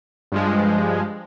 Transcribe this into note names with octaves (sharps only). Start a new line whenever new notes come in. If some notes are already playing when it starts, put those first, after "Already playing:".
G2 F3 G#3